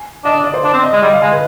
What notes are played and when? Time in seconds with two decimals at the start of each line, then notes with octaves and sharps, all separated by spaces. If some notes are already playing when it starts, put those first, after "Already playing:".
Already playing: G#5
0.25 D4 D#5
0.35 D#5
0.44 D5
0.54 C5
0.64 D4 D5
0.73 C4
0.83 D#5
0.93 G#3
1.02 G3 D#5
1.13 F5
1.22 G#3 G#5
1.31 B4